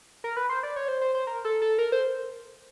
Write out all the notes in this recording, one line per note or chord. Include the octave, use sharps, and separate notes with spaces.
A#4
B4
C5
D5
C#5
C5
C5
C5
A#4
A4
A4
A#4
C5